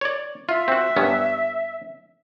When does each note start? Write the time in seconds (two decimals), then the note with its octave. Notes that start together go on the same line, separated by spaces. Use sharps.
0.01 C#5 D5
0.49 F4 E5
0.68 C4 F#4
0.96 G2 B3 C#4